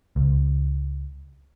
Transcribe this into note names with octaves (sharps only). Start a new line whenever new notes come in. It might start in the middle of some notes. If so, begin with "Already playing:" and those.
C#2